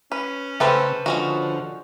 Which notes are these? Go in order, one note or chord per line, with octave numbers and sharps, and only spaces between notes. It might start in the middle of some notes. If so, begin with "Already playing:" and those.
C#4 B4
C#3 A3 C4 G4 A4 B4 C5
D3 F3 G#3 C#4 F#4